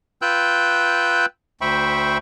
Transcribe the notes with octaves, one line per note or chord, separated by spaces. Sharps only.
F4 B4 G5 E6 F#6 G6
D2 C5 E5 G5 B5 C#6